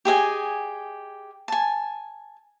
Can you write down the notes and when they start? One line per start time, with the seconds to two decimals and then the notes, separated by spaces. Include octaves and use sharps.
0.05 G4 G#4 D#5 G#5
1.48 G#5 A5